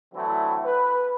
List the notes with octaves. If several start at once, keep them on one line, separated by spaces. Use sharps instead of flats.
D3 E3 F#3 A3 C4 E4
B4